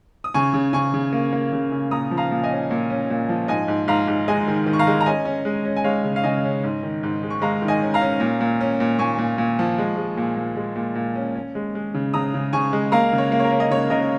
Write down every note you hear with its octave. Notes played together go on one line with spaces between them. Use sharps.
D#6
C#3 G#5 C#6
C#3
C#3 G#5 C#6
C#3
A#3
A#3
C#3
C#3
A#2 A#5 D#6
F3
F5 A#5
A#2
D#5 G#5
C#4
A#2
C#4
A#2
F3
G#2 D#5 G#5
G#2
G#2 F5 A#5
G#2
G#3 D#5 G#5
D#3
D#3
C#6
F5 A#5
G#3
A#5
C#4 D#5 G#5
C#4
G#3
C#4
G#5
G#3 C#5 F5
C#3
F5
C#3 D#5 G#5
C#4
G#2
D#3
G#2
G#3
C#6
G#3 F5 A#5
D#3
D#5 G#5
C#4
F5 A#5
C#4
A#2
A#2
C#4
A#2
A#2 G#5 C#6
A#2
A#2
F3
G#3
G#3
A#2
A#2
G#3
A#2
A#2
C#4
C#4
G#3
G#3
C#3
C#3 A#5 D#6
C#3
C#3 G#5 C#6
G#3
A#3 F5 A#5
C#3
C#5
A#3
C#5
A#4
C#4
D#5
C#3 C#5
C#3 A#4 D#5